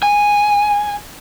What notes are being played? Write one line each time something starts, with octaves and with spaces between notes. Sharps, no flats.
G#5